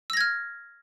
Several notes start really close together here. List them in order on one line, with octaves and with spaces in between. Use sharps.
E6 A#6 G#6 F6